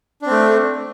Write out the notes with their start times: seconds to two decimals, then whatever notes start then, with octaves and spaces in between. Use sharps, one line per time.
0.22 D4
0.26 C4
0.31 A3